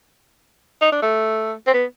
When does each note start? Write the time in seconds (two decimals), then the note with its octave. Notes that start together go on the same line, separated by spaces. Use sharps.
0.81 D#4
0.92 D4
1.02 A3
1.67 C4
1.74 B3